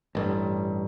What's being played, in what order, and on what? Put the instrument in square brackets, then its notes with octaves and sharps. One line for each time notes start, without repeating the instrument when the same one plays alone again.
[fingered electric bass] A1 G2